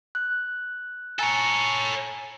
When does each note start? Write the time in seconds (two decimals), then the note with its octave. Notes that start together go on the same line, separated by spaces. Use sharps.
0.15 F#6
1.19 A4 C#5 G#5 A#5